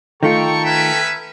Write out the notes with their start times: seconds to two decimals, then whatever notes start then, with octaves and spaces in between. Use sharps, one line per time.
0.23 D#3 A3 F4 A4 G5 A#5 C#6
0.65 C#4 B4 E5